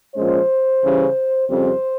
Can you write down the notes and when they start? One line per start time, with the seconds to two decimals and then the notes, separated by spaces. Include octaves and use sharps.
0.15 A#2 F3 G#3 C#4 C5
0.82 C#3 E3 G3 C#4
1.48 F2 C#3 G3 C4 C5